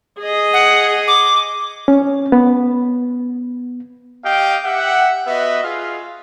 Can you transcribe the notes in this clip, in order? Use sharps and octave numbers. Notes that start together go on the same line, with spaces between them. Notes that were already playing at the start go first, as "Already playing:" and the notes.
G#4 D#5
F#5
D6
C#4
B3
G4 D#5 F5 G5
G4 E5 F#5
B3 F#4 B4 D#5 E5
F4 G#4 F5